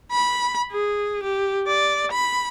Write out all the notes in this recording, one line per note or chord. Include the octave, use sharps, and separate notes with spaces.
B5
G#4
G4
D5
B5